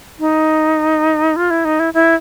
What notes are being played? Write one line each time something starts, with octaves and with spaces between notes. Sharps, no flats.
D#4
F4
E4
D#4
E4
E4